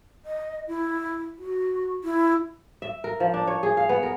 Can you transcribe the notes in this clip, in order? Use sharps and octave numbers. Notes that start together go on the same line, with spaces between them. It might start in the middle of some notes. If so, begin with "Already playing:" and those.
D#5
E4
F#4
E4
E5
A#4
F3
D4
C#5
G#4
F5
B3
A#4